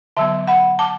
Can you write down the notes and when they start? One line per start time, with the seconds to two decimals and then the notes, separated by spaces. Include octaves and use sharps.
0.17 D3 F#3 B3 E5 A5
0.47 F#5 B5
0.79 A5 D6